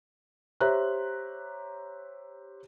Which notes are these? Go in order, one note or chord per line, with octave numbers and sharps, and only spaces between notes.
G4 C5 C#5 E5 A#5 F#6